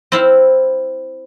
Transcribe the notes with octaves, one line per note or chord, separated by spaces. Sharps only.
C4 E4 F5